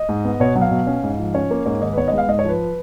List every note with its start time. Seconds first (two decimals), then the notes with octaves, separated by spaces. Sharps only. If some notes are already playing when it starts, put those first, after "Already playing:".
Already playing: D#5
0.09 G#2
0.25 B3
0.40 B2 C#5
0.56 F#3
0.62 F5
0.71 B2
0.87 C#4
1.04 G#2
1.19 F3
1.34 C#4 C#5
1.51 A#3
1.66 G#2 C#5
1.82 D#3 D#5
1.93 B4
1.98 B3 C#5
2.08 G#3 D#5
2.18 F5
2.28 G#2 D#5
2.39 C#5
2.45 F3 B4